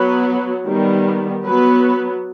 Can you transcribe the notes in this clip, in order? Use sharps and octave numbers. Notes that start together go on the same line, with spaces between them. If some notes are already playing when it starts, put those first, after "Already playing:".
Already playing: F#3 B3 B4
D#3 G3 B3
F#3 B3 B4